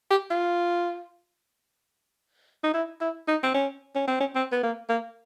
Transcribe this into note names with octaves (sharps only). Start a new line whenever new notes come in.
G4
F4
D#4
E4
E4
D#4
C4
C#4
C#4
C4
C#4
C4
B3
A#3
A#3